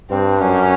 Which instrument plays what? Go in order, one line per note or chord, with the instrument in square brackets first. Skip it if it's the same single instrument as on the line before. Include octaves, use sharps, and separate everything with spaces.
[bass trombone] G2 [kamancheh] C4
[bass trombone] F#2 [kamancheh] C#4